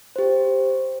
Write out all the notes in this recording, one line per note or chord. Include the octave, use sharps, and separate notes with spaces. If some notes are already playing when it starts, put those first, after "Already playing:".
G4 C5